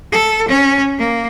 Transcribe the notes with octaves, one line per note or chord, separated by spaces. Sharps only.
A4
C#4
A#3